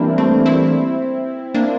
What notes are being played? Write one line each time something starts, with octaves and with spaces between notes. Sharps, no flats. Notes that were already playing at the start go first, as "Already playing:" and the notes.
Already playing: E3 G3 A#3 C4 D4 E4
A3 C4
C4 E4
A#3 D4